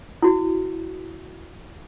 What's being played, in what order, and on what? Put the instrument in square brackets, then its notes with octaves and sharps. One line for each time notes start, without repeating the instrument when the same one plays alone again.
[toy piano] E4 F#4